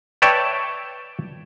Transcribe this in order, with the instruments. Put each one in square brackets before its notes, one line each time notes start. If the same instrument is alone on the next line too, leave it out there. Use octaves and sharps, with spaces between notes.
[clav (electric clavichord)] B4 C#5 D5 E5 G5 A5